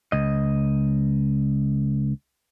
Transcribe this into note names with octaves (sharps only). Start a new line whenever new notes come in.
C#2 D#5